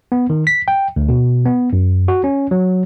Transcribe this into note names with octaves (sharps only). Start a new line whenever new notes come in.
B3
D#3
B6
G5
D2
B2
B3
F#2
F#4
C#4
F#3